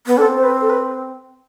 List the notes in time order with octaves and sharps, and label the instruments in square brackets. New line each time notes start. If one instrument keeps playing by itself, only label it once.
[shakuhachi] B3
[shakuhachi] D4 [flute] A4
[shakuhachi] C4
[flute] C5
B4
A4
B4